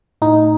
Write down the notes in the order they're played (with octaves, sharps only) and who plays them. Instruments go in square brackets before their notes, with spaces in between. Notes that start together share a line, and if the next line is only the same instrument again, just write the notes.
[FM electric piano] A2 D#4